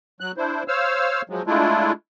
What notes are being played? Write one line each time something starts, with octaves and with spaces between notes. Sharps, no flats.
F#3 F#6
D4 E4 C5
C5 C#5 F5 E6 F6
F3 F#3 G#3
G#3 A3 D4 E4 F4